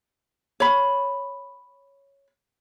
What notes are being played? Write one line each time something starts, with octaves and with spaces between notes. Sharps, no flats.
C#5 B5